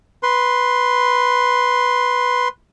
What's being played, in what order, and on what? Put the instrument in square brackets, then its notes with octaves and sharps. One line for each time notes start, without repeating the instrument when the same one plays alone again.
[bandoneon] B4 C6